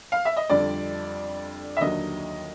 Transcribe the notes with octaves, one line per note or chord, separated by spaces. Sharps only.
F5
E5
D#5
F2 D3 G3 D5
E5
D#2 D3 F#3 D#5